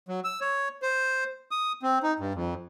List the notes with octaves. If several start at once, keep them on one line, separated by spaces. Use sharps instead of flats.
F#3
E6
C#5
C5
D#6
C4
D#4
G2
F2